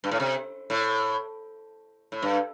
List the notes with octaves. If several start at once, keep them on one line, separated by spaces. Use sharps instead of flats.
G2
A2
C3
A2
A2
G2